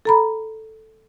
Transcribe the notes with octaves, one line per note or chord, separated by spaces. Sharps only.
A4 A#5 B5